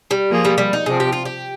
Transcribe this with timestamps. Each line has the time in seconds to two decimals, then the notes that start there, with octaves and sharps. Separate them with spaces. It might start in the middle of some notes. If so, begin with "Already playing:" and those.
0.11 G3
0.30 F3 A#3 F4 G#4
0.45 G3
0.58 G3
0.73 D#4
0.86 C3 F3 C4 G#4
1.00 G4
1.12 F4
1.25 G4